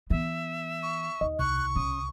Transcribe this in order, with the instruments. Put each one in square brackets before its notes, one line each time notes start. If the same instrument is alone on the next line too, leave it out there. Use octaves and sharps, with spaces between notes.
[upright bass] E3 B3 [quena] E5
[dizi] C#6
[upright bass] D#2 [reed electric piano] D#5
[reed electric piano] C2 [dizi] C#6 [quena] F#6
[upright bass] C#3 [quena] D#6